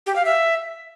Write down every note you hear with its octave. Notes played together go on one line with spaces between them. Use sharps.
G4
F5
E5